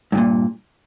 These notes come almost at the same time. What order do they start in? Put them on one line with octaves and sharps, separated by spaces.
G2 C#3 A#2